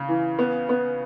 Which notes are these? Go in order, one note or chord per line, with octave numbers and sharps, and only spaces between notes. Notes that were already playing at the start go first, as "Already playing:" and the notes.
Already playing: C#3
E3
B3
B3